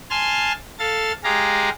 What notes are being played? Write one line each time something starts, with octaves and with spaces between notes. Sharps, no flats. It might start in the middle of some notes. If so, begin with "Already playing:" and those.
G#5 A5 C6 F6
A4 F5 A6
G#3 G4 G#4 F5 A#5